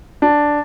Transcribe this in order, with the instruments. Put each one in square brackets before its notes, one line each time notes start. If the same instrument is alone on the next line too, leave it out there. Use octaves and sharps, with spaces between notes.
[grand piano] D4